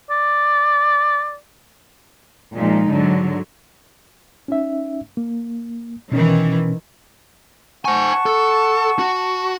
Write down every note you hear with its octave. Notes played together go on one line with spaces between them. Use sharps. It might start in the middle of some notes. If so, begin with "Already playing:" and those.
D5
A#2 F3 G#3 D#4
G#2 D3 F#3
C#4 D#4 E5
A#3
B2 D#3 E3 C#4
C5 F#5 G#5 A5 C#6
A4
F#4